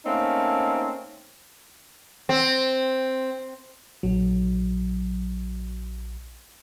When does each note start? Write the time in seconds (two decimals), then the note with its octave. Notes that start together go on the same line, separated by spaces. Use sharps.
0.05 A3 A#3 C4 C#4 D#4
2.29 C4
4.03 A#1 F#3